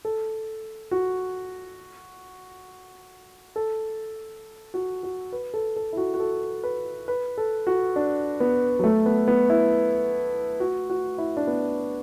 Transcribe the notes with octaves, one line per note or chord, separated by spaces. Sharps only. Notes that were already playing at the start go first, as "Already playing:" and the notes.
A4
F#4
A4
F#4
F#4
B4
A4
A4
E4
F#4
F#4
A4
B4
B4
A4
F#4
D4
B3
F#3
A3
B3
B3
E4
F#4
F#4
E4
D4
B3